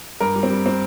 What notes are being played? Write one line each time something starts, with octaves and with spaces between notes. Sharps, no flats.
G2 A#4
G3
C4
G3
C4